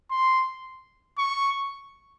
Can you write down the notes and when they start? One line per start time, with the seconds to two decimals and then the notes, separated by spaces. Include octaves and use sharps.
0.11 C6
1.18 C#6